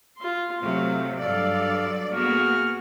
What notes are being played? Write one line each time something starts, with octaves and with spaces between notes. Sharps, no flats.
F4 C6
C3 F#3 A3 F5
G2 F#3 A4 D5 F5
A#3 B3 F#4 G#4 F6